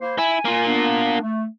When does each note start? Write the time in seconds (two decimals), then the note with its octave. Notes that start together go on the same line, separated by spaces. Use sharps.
0.01 A#3 E4 C5
0.18 E4 G#5
0.45 A#3 F4
0.66 B3 D4
1.22 A3